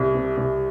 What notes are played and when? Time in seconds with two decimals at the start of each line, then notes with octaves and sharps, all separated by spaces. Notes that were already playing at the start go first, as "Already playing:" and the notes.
Already playing: C2
0.15 C3
0.37 C2